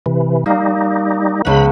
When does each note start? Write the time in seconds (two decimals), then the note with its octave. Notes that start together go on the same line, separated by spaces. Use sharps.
0.06 C3 E3
0.46 G3 A#3 D#4
1.45 C#2 B3 B5